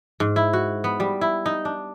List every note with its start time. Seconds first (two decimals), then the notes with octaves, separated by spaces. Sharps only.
0.20 G#2
0.36 E4
0.53 F#4
0.84 B3
1.00 G3
1.21 E4
1.46 D#4
1.65 D4